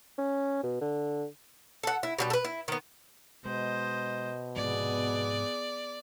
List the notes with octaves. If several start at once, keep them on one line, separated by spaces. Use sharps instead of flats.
C#4
B2
D3
A4 F#5
E4
B2 D3 G3
A4 B4
E4
D#3 B3
B2 G#3 C5 D#5
G#2 C3 F3 B3 G#4 D5